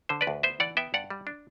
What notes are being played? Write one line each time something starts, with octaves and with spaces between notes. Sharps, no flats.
D3 C5
B4 D5
D2
B3 C5 E5
E3 D5 F#5
B3 E5 G5
G2 D5 F#5
G3
D4